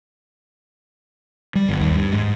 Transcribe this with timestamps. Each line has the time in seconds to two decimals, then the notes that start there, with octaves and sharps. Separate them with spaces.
1.55 G3
1.68 G1
1.81 D#2
1.96 G2
2.13 G#2